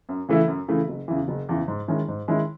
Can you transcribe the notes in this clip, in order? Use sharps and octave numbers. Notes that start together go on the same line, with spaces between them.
F#2
C#3 E3 A3 E4
F#2
C#3 E3 A3 E4
F#1
E2 C#3 E3
F#1
E2 C#3 E3
G#2
D#3 G#3 C#4 E4
G#2
D#3 G#3 C#4 E4